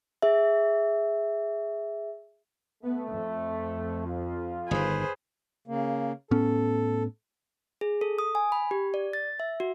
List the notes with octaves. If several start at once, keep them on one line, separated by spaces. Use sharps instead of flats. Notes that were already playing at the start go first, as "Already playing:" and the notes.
G#4 E5
A3 B3
F2
F4
G1 B2 D#3 G#4 B4 C5
C#3 A#3
A2 B3 C#4 A4
G#4
A4
D#6
G#5
B5
G4
D5
A6
E5
F#4